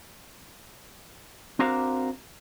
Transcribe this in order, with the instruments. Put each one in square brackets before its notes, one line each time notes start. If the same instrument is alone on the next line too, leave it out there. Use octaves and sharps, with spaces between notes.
[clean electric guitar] C4 D4 F#4 A#4 C5 F5